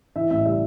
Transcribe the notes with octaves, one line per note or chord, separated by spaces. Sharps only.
E3 E5
A1 E5
G3 E5